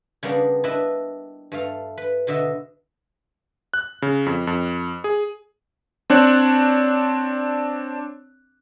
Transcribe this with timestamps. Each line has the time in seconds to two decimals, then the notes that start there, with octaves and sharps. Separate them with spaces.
0.23 C#3 G3 A#3 B3 D4
0.64 D4 E4 B4 D#5 E5
1.52 G2 A3 F5
1.97 B4
2.27 B2 D3 D#5 E5
3.74 F#6
4.02 C#3
4.26 F2
4.47 F2
5.04 G#4
6.10 C4 D4 C#5 F#6